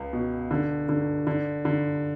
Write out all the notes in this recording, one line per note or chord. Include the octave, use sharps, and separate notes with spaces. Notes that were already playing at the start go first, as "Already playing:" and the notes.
Already playing: C#2
B2
D3
D3
D3
D3